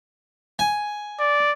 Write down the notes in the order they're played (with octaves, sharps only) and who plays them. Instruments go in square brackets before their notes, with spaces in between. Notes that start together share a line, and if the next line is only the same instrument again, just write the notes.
[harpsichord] G#5
[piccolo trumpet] D5